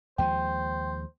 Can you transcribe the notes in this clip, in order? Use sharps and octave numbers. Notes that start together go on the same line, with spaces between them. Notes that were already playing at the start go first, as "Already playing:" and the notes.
D#2 F3 G#3 C5 G5